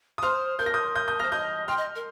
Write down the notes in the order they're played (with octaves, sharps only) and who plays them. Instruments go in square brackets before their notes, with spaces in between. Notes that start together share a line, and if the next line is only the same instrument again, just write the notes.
[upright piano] D#6
[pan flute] C5 [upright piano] C6 F6
[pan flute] A#4 [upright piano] G6
[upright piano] A#6
D#6 G6
D#6 G6
D#6 G6
[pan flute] C5 [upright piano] F6 A#6
[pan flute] D#5 [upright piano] D#6 G6
[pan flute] G5 [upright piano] C6 F6
[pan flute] D#5
A#4